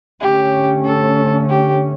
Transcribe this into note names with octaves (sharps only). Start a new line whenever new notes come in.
D3 A3 C#4 G4
A4
G4